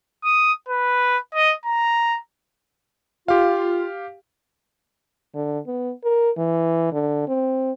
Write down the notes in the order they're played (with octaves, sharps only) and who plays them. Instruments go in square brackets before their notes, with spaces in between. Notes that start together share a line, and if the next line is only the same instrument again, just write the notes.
[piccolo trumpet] D#6
B4
D#5
A#5
[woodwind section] F4 [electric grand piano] G4 F5
[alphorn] D3
B3
A#4
E3
D3
C4